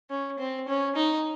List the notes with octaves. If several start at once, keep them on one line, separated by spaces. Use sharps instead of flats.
C#4
C4
C#4
D#4